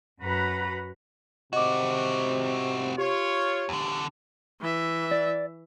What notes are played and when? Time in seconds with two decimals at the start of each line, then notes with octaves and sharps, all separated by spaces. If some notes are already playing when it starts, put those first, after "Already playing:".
0.21 F#2 F#4 B4 F#5 A#5 B5
1.53 C3 C4 F#4 D#5 D6
2.98 F4 G4 C#5
3.69 E2 D3
4.61 E3 E5
5.11 D5